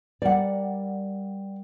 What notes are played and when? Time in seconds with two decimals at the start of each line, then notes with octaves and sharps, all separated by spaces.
0.22 G3 A#4 D5 F#5